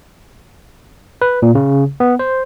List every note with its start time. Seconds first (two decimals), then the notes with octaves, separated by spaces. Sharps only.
1.22 B4
1.42 A#2
1.55 C#3
2.00 B3
2.19 C5